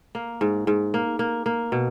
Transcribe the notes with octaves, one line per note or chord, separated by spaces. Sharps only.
A#3
G#2
G#2
A#3
A#3
A#3
B2